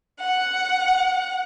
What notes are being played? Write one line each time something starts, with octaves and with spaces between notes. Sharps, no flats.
F#5